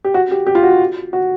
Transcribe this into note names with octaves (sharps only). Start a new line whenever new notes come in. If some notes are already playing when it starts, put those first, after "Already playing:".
G4
F#4
G4
G4
F4
F#4
G4
F#4